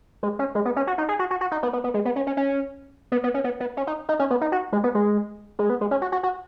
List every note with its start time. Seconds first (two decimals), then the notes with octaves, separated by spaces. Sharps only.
0.23 G#3
0.39 C#4
0.55 G#3
0.65 B3
0.76 C#4
0.87 F#4
0.98 D#4
1.09 G#4
1.19 F#4
1.31 F#4
1.41 F#4
1.51 D#4
1.63 B3
1.73 B3
1.84 B3
1.94 G#3
2.05 B3
2.16 C#4
2.27 C#4
2.37 C#4
3.12 B3
3.24 B3
3.34 C#4
3.44 B3
3.60 B3
3.77 C#4
3.87 D#4
4.09 D#4
4.19 C#4
4.30 B3
4.41 D#4
4.52 F#4
4.73 G#3
4.84 B3
4.95 G#3
5.59 G#3
5.70 B3
5.81 G#3
5.91 C#4
6.02 F#4
6.12 F#4
6.23 F#4